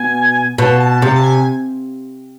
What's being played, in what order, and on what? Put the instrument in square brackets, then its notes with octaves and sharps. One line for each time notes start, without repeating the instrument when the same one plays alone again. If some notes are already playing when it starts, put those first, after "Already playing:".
Already playing: [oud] B2 [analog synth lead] G#5
[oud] B2 [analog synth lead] A5
[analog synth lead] A5
[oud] C3 [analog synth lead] A5
[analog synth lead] A5
G#5